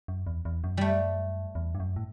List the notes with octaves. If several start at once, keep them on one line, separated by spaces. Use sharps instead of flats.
F#2
E2
E2
F#2
G3 A3
E2
G2
F#2
A2